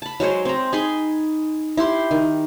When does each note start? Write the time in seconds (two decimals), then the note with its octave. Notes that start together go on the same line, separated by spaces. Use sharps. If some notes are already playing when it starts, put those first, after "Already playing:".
0.02 A5 B5
0.20 F#3 G#3 C5 C#5
0.45 C4 A#5
0.72 D#4 G#4 B5 C6
1.77 E4 G4 C6
2.11 D#3